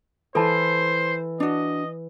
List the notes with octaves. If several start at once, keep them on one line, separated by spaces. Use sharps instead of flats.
E3 A4 C5 A5
D4 F#4 D#5